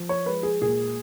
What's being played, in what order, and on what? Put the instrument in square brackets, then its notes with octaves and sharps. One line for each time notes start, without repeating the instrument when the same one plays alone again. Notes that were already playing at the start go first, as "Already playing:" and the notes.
Already playing: [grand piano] F3
C#5
G#3 B4
G#4
A#2 G#4